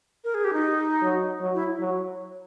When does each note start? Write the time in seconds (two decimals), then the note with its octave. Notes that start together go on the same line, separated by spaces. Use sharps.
0.24 A#4
0.34 G#4
0.44 G4
0.53 D#4
1.02 F#3
1.41 F#3
1.54 E4
1.79 F#3